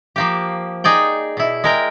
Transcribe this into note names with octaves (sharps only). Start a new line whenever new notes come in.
F3 A#3 G4
D#4 G#4 D5 G5
B2 E4
G#3 A#4 G5